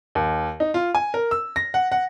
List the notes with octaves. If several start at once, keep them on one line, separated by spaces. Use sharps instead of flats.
D#2
D#4
F4
G#5
A#4
E6
A#6
F#5
F#5